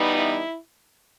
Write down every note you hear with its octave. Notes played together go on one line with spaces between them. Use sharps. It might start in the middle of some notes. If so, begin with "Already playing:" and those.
Already playing: E3 G3 B3 D#4
E4